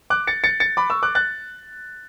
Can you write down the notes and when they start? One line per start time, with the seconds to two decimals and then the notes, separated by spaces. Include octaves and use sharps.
0.10 D6 F#6
0.27 A6 C#7
0.44 A6 C#7
0.60 A6 C#7
0.77 B5 D6
0.90 C#6 E6
1.03 D6 F#6
1.15 F#6 A6